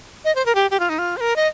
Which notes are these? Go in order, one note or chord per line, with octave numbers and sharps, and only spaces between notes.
D#5
C5
A#4
G4
G4
F4
D#4
F4
C5
A#4
D#5